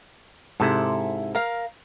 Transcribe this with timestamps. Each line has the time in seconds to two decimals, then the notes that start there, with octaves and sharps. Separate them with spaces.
0.60 G#2 C3 E4 A4
1.35 A#4 F5